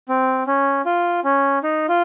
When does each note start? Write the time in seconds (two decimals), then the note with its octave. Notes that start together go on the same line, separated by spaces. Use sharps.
0.09 C4
0.47 C#4
0.85 F4
1.24 C#4
1.63 D#4
1.88 F4